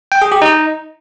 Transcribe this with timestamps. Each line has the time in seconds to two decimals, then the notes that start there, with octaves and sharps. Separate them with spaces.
0.12 G5
0.22 G#4
0.32 G4
0.42 D#4